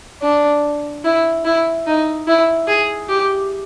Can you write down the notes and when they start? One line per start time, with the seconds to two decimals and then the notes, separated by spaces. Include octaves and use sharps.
0.22 D4
1.04 E4
1.45 E4
1.87 D#4
2.27 E4
2.67 G#4
3.09 G4